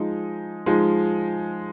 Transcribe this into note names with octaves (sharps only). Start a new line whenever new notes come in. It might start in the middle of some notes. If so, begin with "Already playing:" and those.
Already playing: F3 G#3 D#4
F3 G#3 D#4